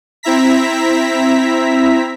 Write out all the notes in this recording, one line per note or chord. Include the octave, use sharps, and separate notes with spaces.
C4 E4 E5 A#5 B6